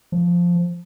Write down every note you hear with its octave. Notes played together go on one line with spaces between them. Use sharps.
F3